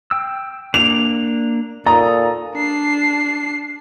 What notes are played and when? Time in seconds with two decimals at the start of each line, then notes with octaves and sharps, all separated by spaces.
0.11 G5 E6
0.74 A#3 D4 F7
1.86 A#2 A4 A#5 D#6
2.54 D4 C7